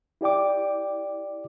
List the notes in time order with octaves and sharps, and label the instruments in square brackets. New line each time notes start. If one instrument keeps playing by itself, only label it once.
[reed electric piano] E4 G4 D5 G5 D6